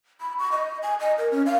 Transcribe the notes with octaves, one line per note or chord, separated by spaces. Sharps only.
B5
C#6
D#5
G#5
D#5
A#4
C#4
F5